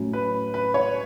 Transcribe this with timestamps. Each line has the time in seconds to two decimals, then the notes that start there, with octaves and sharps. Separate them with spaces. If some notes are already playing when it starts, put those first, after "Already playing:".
Already playing: A2 F#3 C#4
0.13 B4
0.54 B4
0.74 C#5